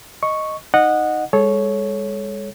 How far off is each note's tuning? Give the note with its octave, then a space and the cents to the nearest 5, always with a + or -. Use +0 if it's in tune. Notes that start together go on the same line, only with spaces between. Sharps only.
D#5 +0 C#6 +0
D#4 +0 D#5 -20 F#5 -10
G#3 -40 A4 -35 C#5 +0